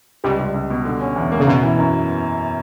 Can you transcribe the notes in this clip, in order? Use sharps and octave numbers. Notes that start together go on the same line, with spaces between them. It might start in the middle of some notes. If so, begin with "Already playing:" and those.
C#2 G3
C#2
C#2
B2
D3
C#4
E2
A#3
C#3
F#2 B2
E3
F#2